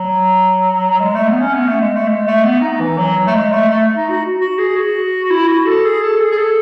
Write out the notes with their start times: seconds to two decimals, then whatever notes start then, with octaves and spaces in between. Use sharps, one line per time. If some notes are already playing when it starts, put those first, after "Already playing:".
Already playing: F#3
1.01 G#3
1.14 A3
1.28 B3
1.41 C#4
1.54 B3
1.68 A3
1.81 G#3
1.95 A3
2.08 G#3
2.27 A3
2.44 B3
2.61 D#4
2.80 E3
2.98 F#3
3.27 A3
3.34 G#3
3.52 A3
3.69 A3
3.96 D#4
4.09 F#4
4.41 F#4
4.58 G#4
4.76 F#4
5.30 E4
5.48 F#4
5.66 A4
5.84 G#4
6.02 A4
6.20 G#4
6.32 G#4
6.38 A4